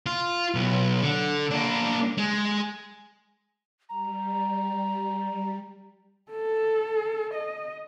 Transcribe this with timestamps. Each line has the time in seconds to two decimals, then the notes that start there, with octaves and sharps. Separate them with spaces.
0.06 F4
0.55 B1
1.02 D3
1.51 A#3 D4
2.18 G#3
3.89 G3 A#5
6.31 A4
7.34 D#5